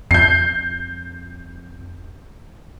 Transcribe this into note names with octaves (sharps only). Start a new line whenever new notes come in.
F2 G6 C7